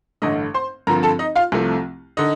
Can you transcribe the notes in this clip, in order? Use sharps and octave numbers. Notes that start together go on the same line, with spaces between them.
A1 G2 D3 A3 D#5 D#6
C5 C6
G2 D3 F3 C4 A#4 A#5
A4 A5
D#4 D#5
F4 F5
C2 C3 F3 A3
D3 D#4 D#5